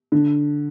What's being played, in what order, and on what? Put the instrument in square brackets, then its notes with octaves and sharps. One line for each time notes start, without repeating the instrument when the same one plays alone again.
[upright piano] D3